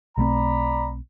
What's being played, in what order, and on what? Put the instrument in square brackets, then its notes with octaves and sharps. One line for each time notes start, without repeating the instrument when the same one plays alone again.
[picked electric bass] B1 A3 C4 [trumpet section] D5 A#5 B5